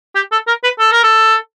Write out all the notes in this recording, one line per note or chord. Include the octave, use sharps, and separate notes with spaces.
G4
A4
A#4
B4
A4
A#4
A4